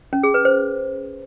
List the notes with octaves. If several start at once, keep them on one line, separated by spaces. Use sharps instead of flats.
C#4
G#4
B4
C5